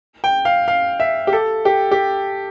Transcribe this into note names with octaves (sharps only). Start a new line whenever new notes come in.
G5
F5
F5
E5
G4
A4
G4
G4